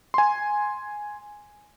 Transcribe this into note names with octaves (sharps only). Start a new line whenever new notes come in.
G#5 C6